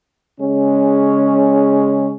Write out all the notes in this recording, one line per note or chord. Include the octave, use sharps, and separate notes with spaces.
C#3 G#3 C#4